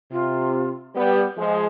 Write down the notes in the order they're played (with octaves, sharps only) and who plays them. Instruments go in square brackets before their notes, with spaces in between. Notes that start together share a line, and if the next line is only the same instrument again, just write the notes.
[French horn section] C3 [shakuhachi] F4
[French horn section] G3 B3 [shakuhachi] G4
[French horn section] F3 G#3 [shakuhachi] G#4